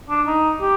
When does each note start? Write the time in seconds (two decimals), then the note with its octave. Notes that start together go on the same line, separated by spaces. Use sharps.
0.10 D4
0.27 D#4
0.61 G4